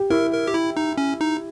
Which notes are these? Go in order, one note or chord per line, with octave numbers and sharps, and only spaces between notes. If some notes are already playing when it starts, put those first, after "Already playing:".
Already playing: G4
E4 A#4
A#4
G4
E4
D#4
C#4
D#4